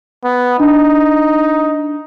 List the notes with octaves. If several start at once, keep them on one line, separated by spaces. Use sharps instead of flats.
B3
D4 D#4